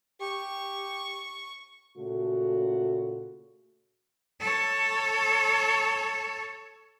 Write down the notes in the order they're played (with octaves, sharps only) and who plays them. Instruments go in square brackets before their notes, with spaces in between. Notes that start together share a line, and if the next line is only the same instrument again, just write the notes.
[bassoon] G4 [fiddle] C#6
[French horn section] A#2 C#3 A3 F#4 A4
[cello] A4 C#5